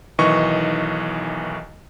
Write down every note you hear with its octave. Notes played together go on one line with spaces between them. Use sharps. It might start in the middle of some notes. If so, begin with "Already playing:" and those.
B1 D#3 E3 D#5 C#6